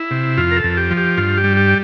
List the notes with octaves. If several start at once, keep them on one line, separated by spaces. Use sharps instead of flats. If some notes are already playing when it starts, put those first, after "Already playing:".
Already playing: E4
C3
F2 F4
A#4
A4
F2
G4
F3
G4
G2 F4
G4
G3
G4